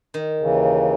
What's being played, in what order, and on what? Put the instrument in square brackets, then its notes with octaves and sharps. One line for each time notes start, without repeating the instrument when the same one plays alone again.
[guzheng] D#3
[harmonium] D#2 C#3 E3